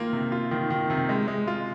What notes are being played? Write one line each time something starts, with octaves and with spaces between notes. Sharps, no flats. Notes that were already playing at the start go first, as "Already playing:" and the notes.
Already playing: D#3 A#3 F4
C3
F4
D#3
D#3
C3
G#3
G#3
F4